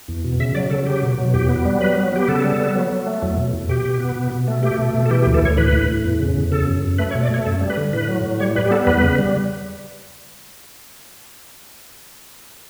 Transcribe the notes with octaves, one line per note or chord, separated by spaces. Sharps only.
E2
B2
C#3 E5
F#3 D5
C#3 A4
F#3 G4
B2
B2
E2 G4
B3
G3
F#3 B4
B3
B3 G4
C#3 A4
G3
B3
F#3
F#3
A3
E2
B2
E2
B2 G4
B2
B3
B2
B2
A3
A3 G4
B2
B2
A4
E3 G4
G4
D2
A4
D2 C#5
A2 B4
A2
A2
E2
C#3
E2
C#3 A4
F#2
F#2
A3 B4
C#5
B2
D5
A3 C#5
F#2 A4
G3
B4
D3
A2 B4
F#3
A2
G3 C#5
G3 B4
G4
B3 A4
E2 B4
C#3
G3